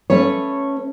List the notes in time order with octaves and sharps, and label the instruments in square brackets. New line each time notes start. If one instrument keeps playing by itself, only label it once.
[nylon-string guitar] A3 C#4 B4 C#5